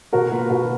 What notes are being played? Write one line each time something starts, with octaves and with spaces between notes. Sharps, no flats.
B2 F#4 A#4
A#3 F4 B4
B2 F#4 A#4